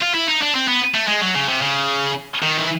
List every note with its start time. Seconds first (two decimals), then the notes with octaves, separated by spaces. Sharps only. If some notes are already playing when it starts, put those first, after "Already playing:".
0.01 F4
0.14 E4
0.27 D#4
0.42 D4
0.55 C4
0.68 B3
0.94 A3
1.08 G#3
1.21 F#3
1.35 C#3
1.49 C3
1.62 C#3
2.43 D#3
2.57 E3